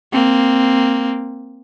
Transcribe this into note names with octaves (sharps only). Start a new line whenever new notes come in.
A#3 C4